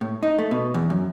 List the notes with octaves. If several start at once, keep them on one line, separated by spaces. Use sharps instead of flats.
A2
D#4
A3
B2
E2
F#2